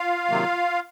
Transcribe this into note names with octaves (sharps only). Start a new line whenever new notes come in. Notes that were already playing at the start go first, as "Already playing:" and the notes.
Already playing: F4 F5
C3 D#3 F#3 A#3